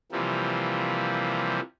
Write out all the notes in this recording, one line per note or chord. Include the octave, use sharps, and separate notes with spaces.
C3 E3 F3 G3 A#3